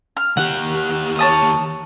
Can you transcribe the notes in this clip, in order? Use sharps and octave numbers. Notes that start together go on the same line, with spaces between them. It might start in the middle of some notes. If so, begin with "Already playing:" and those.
F6
D#2 G4 F#5
C#5 A5 D#6